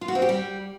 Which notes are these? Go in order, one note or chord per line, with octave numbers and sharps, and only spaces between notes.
F4
F#4
C4
G4
G3